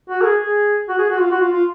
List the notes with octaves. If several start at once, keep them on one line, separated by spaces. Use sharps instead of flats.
F#4
A#4
G#4
G#4
F#4
G#4
F#4
F4
F#4
F4
F4